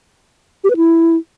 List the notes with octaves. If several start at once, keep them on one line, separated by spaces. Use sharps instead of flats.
G4
B4
E4